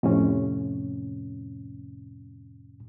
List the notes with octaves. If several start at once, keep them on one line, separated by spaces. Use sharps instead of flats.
F2 A2 C3 C#4